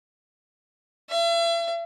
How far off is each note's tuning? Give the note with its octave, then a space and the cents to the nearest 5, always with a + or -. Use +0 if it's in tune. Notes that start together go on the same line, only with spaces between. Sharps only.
E5 +40